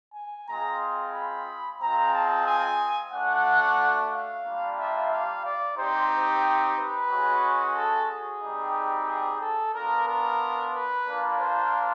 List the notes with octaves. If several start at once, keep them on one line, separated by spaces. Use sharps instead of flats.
G#5
G#3 C4 F4 A#5
B5
G#3 C4 F4 A#5
A5
G#5
A3 D4 F#4 F#5
F5
G3 A#3 D4 F4
E5
F5
D5
C4 D#4 G4 C5
B4
G#3 C#4 F#4
A4
G#4
G3 C4 D#4 G4
G#4
A4
B3 D4 F4 A#4
A#4
B4
A#3 D4 F4
C5